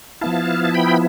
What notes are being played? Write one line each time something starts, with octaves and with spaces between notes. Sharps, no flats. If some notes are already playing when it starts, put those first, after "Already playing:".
F3 B3 E4 F5 A5
A5
G5 B5